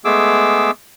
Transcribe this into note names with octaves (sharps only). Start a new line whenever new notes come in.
G#3 A3 B3 G#4 D6 E6